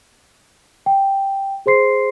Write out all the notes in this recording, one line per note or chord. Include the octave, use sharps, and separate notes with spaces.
G5
G#4 C5 C6 C7